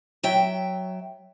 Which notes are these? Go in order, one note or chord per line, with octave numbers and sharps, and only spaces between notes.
F#3 E5 G5